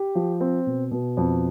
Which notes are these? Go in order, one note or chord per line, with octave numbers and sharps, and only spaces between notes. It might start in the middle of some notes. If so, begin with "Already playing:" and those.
Already playing: G4
F3
C4
B2
B2
F2